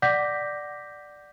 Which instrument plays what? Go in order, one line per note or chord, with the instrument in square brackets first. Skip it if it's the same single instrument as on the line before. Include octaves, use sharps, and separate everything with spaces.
[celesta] D5 F#5 D6 G6 A#6 B6